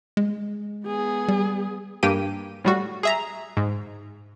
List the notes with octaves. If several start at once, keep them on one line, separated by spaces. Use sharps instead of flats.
G#3
B3 G#4
G3
G2 A#3 G4 G5 D#7
A2 G3 F#4
G#4 E5 A#5
G#2